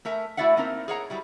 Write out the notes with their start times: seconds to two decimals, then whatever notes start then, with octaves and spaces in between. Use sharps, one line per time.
0.05 A3 A#4 E5 G#5
0.37 A3 E4 F#4 D5 E5 F#5
0.57 A#3 C4 D#4 E4 G#4 A#4
0.88 G#4 A#4 C#5 D#5 F#5 A#5
1.10 F#3 G3 E4